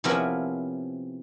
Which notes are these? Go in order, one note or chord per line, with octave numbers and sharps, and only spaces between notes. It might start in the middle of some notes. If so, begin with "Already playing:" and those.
C3 F3 B3 C#4 E4 A#4